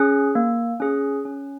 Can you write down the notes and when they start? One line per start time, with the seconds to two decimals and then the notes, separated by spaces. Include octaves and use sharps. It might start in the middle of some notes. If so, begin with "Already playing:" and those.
Already playing: C#4 G#4
0.35 A#3
0.80 C#4 G#4
1.25 C#4